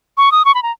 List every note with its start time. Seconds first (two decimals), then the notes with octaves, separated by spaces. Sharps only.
0.17 C#6
0.32 D#6
0.45 C#6
0.55 B5
0.63 A#5